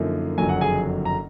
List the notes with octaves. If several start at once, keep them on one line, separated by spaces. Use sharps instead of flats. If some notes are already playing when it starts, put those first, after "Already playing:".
Already playing: F#2 D3 F3 A#3 D#4
F#1 F2 D3 F#3 G#5
F#5
G#4 G#5
A#5